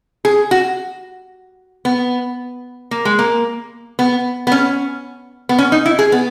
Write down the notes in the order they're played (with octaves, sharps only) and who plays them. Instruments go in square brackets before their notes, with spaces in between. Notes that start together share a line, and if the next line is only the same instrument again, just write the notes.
[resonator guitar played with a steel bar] G#4
F#4
B3
A#3
G#3
A#3
B3
B3
C#4
B3
C#4
D#4
E4
G#4
B3